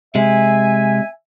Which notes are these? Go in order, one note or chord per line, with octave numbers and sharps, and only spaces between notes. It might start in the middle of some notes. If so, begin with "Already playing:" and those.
C3 G#3 E5 G#5